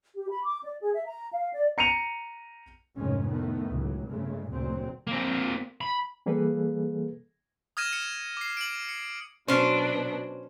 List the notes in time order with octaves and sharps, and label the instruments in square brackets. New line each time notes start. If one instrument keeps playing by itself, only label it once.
[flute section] G4
B5
D6
D5
G#4
E5
A#5
F5
D5
[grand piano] A#5 C#7 D#7 F7
[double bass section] F1 G#2 D#3 G#3 C#4
A2 D#3 A3 B3
C#2 A2 F#3
G1 C#3 G#3 A3
F#1 D2 A#2 F#3 C4
[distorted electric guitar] A#3 C4
B5
[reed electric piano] E3 G3 A#3 G#4 A4 B4
[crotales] D#6 F6 G#6 A#6 D#7 E7
C#7
D6 C7
D7 F#7
C#7
[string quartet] B2 F#3 D4 [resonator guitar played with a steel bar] C#4 C5